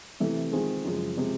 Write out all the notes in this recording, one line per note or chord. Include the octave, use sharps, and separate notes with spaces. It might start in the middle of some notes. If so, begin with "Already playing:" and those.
C3 E3 A3
D#3 G#3 C4 F4 G#4
F#2 C#3 F3 G#3
C3 F3 G#3